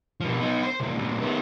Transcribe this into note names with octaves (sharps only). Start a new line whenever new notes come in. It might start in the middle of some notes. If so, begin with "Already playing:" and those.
B2 F3
B3 D#4
C5 C6
C2 A#3
D2 A#2
D#3 B3